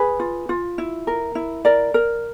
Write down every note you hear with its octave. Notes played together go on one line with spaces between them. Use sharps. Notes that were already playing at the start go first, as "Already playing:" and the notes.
Already playing: G#4 B4
F4
F4
E4
A#4
E4
A#4 D5
A#4